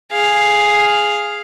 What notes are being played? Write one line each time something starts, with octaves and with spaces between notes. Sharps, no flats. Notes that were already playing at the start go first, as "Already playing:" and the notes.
G#4 F5